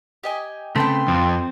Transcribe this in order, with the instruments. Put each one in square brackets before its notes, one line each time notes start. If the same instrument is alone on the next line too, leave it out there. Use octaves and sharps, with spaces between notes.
[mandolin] G4 D#5 G#5
[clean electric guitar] C#3 A3 C4 [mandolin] A4 B4 G5 [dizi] C6
[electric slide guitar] F2 [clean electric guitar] C4